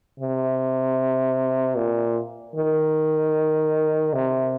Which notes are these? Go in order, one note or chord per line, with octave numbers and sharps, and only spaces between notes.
C3
A#2
D#3
C3